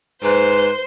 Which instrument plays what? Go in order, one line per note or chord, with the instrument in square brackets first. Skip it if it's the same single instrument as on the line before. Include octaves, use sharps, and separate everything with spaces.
[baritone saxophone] G#2 [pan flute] B4 [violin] C5